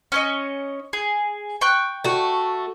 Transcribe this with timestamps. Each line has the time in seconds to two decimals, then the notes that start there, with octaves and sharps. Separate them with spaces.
0.12 C#4 C#5 D#5
0.93 G#4
1.61 G5 C#6 F#6
2.04 A3 F#4